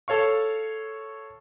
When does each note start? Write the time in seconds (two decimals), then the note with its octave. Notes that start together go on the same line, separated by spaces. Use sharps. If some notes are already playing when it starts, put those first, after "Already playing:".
0.08 A4 C#5 F5 C#6